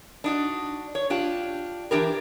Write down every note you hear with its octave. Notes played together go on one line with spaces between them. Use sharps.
D4 D#4 F#4
C#5
D4 F4 G4
E3 D4 G4 A#4